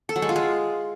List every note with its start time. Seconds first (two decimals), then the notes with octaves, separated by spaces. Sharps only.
0.09 A4
0.16 F#3
0.22 G#3
0.29 F4
0.36 G#3